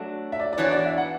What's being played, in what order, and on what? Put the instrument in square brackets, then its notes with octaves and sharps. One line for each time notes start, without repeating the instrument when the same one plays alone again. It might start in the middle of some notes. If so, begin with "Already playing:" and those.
Already playing: [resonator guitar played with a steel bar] F#3 A3 D4
[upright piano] E5
D5
D5
[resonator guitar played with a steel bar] E3 B3 D4 F#4 [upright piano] C#5
[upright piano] D5
E5
F#5